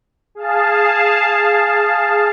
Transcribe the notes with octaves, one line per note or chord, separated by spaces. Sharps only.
G#4 F5 A5